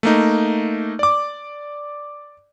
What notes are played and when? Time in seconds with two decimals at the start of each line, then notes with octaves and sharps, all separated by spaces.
0.03 A3 A#3 D#4
0.99 D5 D6